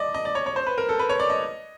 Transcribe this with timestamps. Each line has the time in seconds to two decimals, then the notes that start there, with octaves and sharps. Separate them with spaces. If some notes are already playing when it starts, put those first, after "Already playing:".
Already playing: D5 D#5
0.14 D#5
0.25 D5
0.35 C#5
0.46 C#5
0.56 C5
0.67 B4
0.78 A#4
0.89 A4
0.99 B4
1.10 C#5
1.20 D5
1.30 D#5